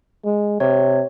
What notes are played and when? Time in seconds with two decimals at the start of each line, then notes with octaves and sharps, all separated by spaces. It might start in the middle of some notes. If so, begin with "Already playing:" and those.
0.25 G#3
0.60 C3 C#5